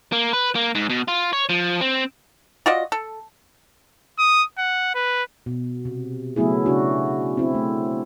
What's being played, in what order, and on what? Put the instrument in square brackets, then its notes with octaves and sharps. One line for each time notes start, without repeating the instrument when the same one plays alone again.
[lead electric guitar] A#3
B4
A#3
G#2
B2
F4
C#5
F3
C4
[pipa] F4 F#4 D5 D#5
A4
[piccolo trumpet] D#6
F#5
B4
[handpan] B2
C3
C#3 F#3 A3 B3 E4 G#4
C#3 D4 F#4
C4 E4
A3